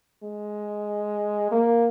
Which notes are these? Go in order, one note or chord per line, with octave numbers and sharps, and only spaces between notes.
G#3
A#3